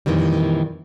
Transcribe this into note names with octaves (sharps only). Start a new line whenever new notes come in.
F2 A#2 D#3 E3 G3